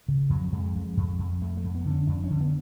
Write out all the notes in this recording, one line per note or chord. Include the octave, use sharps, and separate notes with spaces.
C#3
F2 F#3
F2 G#3
F2
F2
F2
F2 A3
A3
F2
B3
D3
C#4
F2 D4
C#4
D3
B3